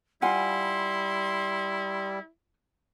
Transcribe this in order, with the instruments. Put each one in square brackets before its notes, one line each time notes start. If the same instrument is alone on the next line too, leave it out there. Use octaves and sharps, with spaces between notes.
[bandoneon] G3 [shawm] E4 [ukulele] F4 F#5 G#5 [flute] C6